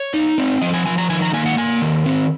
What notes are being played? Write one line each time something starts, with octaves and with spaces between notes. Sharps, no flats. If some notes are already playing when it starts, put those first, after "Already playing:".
Already playing: C#5
D#4
C4
F3 D#5
G#5
F3 G#5
A#5
D#3 G#5
A#5
A#3 G#5
F#5
A#3 G#5
D#3
C4